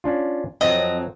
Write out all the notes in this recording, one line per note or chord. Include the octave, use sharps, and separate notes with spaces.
C#4 D4 F4
F2 F#3 C4 D#5